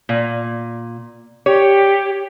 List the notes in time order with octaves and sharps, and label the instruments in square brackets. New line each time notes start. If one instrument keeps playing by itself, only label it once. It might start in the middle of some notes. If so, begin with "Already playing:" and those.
[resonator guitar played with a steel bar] A#2
[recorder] G4 [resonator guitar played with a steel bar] C#5